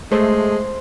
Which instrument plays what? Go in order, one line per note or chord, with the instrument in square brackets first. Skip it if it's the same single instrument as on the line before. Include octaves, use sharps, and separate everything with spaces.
[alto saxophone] G#3 [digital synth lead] A3 [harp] C5